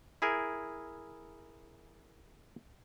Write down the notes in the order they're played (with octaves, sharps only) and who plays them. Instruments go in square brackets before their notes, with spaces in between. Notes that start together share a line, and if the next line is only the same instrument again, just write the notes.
[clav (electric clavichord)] E4 G#4 A#4